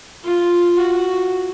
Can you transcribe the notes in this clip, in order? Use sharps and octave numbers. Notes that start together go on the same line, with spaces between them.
F4
F#4